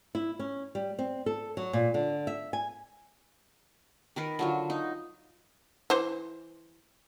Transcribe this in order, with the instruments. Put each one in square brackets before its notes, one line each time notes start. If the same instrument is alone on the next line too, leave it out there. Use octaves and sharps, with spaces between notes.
[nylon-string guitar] E4
C#4
G3
C4
A4
F#3
A#2
D3
E5
G#5
[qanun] D#3 A#4 B4
D3 F#3 F4
D#4
[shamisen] E3 C5